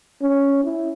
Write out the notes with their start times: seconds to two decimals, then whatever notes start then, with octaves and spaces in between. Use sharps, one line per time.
0.22 C#4
0.64 E4